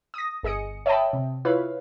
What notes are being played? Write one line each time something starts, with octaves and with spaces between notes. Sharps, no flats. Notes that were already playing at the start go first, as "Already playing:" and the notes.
D#6 A#6
G1 G#4 D#5 D#6 C#7
C#5 D#5 E5 G5 A5 B5
C3
E4 F4 B4 C#5 F5 B5